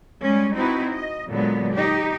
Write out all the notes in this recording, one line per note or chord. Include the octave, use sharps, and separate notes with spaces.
G3 G#3 C#4
C4 D#4 E4 F#4 B4
D#5
A#2 D3 F#3 G#3 B3
D#4 G4